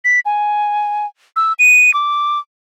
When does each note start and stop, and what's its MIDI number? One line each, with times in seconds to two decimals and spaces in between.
0.05 0.20 95
0.26 1.06 80
1.36 1.53 88
1.59 1.94 99
1.94 2.39 86